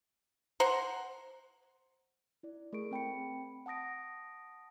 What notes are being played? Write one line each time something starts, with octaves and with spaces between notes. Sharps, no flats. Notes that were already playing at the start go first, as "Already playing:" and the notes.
C5 F#5 A#5 C6
E4 D5
A3 G#4 A#4 C#6 D7
C4 G5 B5 C#7
F#5 A5 D#6 A#6 D7